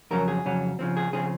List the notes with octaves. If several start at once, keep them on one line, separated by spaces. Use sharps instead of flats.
F2 C#3 F#3 C#4 A#4
G#4
F2 C#3 F#3 C#4
C#3 F3 C4
G#4
C#3 F3 C4 G#4